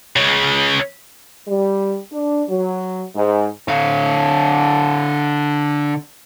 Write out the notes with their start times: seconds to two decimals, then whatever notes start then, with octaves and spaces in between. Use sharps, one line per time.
0.16 C#2 C#3
1.47 G3
2.11 D4
2.48 F#3
3.15 G#2
3.68 D3 F5